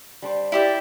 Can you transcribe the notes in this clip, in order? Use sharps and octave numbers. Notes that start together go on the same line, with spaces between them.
G3 D4 C5
E4 G4 D5 E5